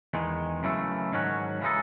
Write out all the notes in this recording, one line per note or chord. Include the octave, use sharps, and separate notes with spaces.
E2 D#3 G#3
F#2 C#3 E3 A3
G#2 D#3 F#3 C#4 F#4
C#3 E3 G#3 D#4 A4